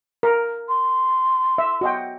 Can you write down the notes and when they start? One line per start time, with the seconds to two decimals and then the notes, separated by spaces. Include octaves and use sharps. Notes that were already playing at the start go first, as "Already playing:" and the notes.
0.23 A#4
0.68 C6
1.58 E5
1.81 F#4 D#5 G5